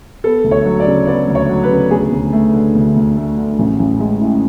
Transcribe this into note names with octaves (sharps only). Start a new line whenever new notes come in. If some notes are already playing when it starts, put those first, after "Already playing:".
B3 A4
D2
C#5
F#3
D5
C#3
B3 D5
D2
C#5
F#3
B4
C#3
D2 G#4
D2
A3
D3
D2
D2
A3
D3
A1
A1
G#3
A2